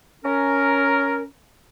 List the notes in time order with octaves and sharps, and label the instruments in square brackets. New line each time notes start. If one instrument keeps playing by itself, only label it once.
[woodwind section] C#4 A#4